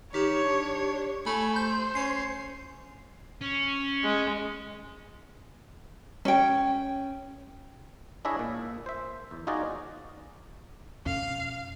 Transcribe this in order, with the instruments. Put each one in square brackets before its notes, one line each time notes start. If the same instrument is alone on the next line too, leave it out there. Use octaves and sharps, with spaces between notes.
[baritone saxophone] D#3 [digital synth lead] G4 [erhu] C#5
[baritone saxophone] D4
[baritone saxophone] A3 [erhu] G#5 [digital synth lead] B5
[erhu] C5 [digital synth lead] G6
[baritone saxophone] C#4 [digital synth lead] C7
[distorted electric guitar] C#4
[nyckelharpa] G#3
[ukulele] C#4 G5
[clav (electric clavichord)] D4 E4 G#4 C#5 D#5 E5
A#2
C5 E5
E2
D#4 F4 F#4 G#4 D5 D#5
[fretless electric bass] F2 B2 C#4 [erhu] F5